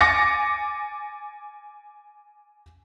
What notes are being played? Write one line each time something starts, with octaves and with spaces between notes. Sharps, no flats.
G#5 D6 A6 A#6 C#7